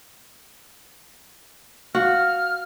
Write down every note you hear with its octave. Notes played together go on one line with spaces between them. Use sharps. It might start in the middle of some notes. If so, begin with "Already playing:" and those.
F#4 F5 F6